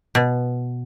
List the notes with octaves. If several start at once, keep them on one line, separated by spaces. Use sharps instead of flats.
B2